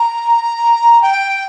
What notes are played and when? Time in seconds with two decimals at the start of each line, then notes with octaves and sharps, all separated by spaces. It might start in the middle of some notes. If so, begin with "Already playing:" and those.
Already playing: A#5
1.01 G5